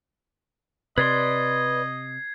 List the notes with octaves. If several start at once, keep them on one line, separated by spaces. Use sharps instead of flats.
C3 B4 D5 D#5 C6 G#6 C7